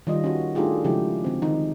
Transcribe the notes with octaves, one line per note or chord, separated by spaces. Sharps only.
D#3 G3 F4 D#5
C#4 F#4
A3 D4 D#4 F4 G4 G#4
C#3 F3 G#3 E4 G4
D3 C4
D#3 D#4